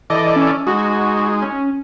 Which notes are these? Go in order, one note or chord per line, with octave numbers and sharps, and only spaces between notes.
E3 A4 D5 D#5
C#4
G#3 D#4 F#4
C#4